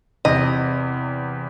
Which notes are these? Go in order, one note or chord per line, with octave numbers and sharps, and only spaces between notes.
E2 C3 D#5